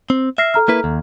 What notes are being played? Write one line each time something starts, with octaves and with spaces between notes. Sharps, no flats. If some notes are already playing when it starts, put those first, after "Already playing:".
C4
E5 F6 A#6 C7
A4 A#5 F6
A#3 E4 B4
D#2